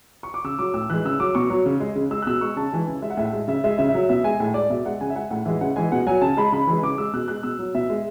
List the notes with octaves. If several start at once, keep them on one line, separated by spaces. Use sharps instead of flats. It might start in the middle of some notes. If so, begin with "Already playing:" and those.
C#6
D6
C#3 E6
F#3 D6
A2 E6
E3 G#3 F#6
C#3 E6
F#3 D6
B2 C#6
F#3
C#3
G#3
C#3
G#3 E6
F#6
B2 E6
G#3 C#6
C#3 A5
E3 G#3 G#5
C#3
G#3 E5
F#5
A2 E5
G#3
C#3 E5
G#3 E5
C#3 E5
E5
F#3
B2 E5
G#3 G#5
A2
G#3 D5
B2 E5
G#3 F#5
C#3 G#5
E5
G#3 F#5
A2 F#5
E3 G#3 E5
C#3 F#5
E3 G#3 G#5
B2 F#5
F#3 G#5
C#3 A5
G#3 B5
C#3 B5
E3 G#3
C#3 D6
G#3 E6
B2 F#6
G#3 F#6
B2 E6
F#3
B2 E5
G#3